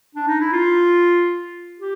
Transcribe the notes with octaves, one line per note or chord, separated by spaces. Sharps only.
D4
D#4
E4
F4
G4